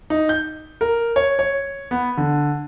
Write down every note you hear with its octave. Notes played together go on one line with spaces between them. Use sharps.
D#4
G6
A#4
C#5
C#5
B3
D3